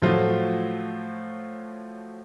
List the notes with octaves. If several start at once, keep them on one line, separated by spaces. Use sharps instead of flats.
A2 F3 F#3 A3 F4 F#4